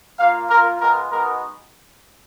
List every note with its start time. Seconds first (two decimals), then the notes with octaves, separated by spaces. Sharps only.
0.18 A#3 F4 F5
0.50 A#3 F4 A#4
0.80 G#3 B3 F4 A#4
1.12 G#3 B3 D#4 F#4 A#4